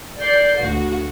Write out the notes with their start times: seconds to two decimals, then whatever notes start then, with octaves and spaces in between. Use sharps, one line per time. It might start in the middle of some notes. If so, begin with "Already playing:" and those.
0.20 D5 G6 C7
0.60 D2 F#4